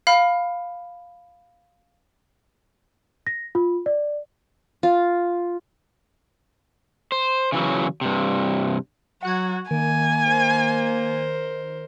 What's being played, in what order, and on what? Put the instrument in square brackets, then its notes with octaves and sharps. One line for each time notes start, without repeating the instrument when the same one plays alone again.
[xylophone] F5 B5 F6
[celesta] A#6
F4
D5
[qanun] F4
[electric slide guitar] C5
C#3 E3 F#3
G2 C3
[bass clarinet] F#3 [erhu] F#4 [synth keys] F#5 F#6 G#6
[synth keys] D#3 [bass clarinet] A#3 [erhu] G#5
[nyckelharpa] A#4 C5